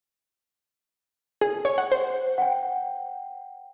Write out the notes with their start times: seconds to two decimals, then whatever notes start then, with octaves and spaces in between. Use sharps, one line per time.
1.41 G#4
1.65 C#5
1.78 F#5
1.92 C5
2.38 F#5 G5